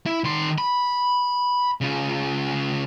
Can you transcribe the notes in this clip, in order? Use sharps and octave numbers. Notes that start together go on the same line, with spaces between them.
E4
D#3 C6
B5
C#3 F4